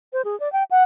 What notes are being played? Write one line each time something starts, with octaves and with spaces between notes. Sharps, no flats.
C5
G#4
D5
G5
F#5